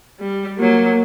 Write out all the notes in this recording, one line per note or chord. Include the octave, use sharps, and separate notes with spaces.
G3
F#3 A#3